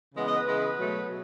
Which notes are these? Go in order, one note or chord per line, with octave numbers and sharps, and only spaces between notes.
C#3 E3 G#3 B3
D#5
B4
C#3 E3 G#3 B3
B2 F#3 A3
B2 F#3